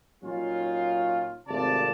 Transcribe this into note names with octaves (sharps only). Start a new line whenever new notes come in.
A#2 F#3 C#4 D#4 F4
G#1 C3 A3 F4 D5 A5